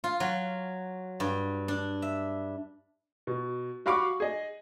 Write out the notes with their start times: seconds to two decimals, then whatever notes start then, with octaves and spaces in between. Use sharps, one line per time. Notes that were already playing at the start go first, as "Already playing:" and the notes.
0.04 F4
0.20 F#3
1.20 G2
1.68 D4
2.02 E5
3.27 B2
3.86 F#4 F5 B5 C#6 D6
4.20 G#4 D#5